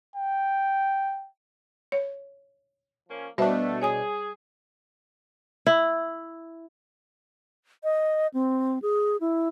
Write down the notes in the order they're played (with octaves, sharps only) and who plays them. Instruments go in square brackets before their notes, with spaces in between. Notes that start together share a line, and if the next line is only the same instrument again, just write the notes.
[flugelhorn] G5
[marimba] C#5
[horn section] F3 A#3 C#4
[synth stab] B2 D4 [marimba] G3 C5 E5 [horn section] A3
[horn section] G#4 [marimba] C#5 G#5 D#6
[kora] E4
[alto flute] D#5
C4
G#4
E4